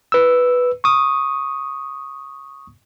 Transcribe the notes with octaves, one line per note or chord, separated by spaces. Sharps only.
B4 E6
C#6 D#6